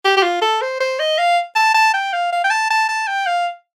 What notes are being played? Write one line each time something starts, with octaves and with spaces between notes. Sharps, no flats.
G4
G4
F4
A4
C5
C5
D#5
F5
A5
A5
G5
F5
F5
G5
A5
A5
A5
G5
F5